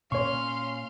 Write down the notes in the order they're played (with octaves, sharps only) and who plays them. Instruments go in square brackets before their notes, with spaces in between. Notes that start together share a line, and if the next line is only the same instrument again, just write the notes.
[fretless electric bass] A#2 A#3 [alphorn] C#4 [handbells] C#5 C#6 [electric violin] F5 C6